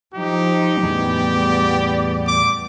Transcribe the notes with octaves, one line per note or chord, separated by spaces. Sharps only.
F3 D#4 G4
E2 A2 G3 B3 G#4 D5
D6